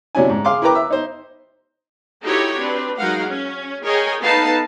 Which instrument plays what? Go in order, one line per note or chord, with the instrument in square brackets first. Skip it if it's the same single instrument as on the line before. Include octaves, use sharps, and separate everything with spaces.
[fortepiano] C3 F#3 C#4 D4 E4 G#5
G#2
G#4 F5 C6 D6
E4 A#4 B4 G5 A#5 D6
E5
D#4 C5
[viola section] D#4 E4 F#4 G4 A4 C#5
C4 D4 B4
F#3 G#3 D#4 A#4 F5 F#5
C#4
G#4 A#4 C#5 D#5 G5 G#5
B3 D#4 A4 B4 F5 A5